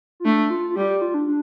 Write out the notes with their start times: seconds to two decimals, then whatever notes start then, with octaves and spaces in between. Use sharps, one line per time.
0.20 F4
0.25 A3 D4
0.50 F4
0.70 F4
0.76 G3 G4
0.89 G4
1.01 F4
1.14 D4
1.27 D4